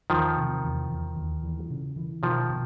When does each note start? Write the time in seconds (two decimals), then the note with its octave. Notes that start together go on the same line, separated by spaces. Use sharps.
0.10 E2 D#3 F3
0.37 C3
0.64 E2
0.90 E2
1.16 D#2
1.43 E3
1.70 C#3
1.96 E3
2.22 B2 D#3 F3
2.50 B2